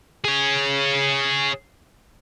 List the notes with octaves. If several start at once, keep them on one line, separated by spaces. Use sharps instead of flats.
G#4 C#5